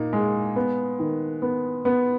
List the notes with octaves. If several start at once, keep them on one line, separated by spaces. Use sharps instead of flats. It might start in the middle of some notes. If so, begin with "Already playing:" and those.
Already playing: A#2 D#4
G#3
B3
D#3
B3
B3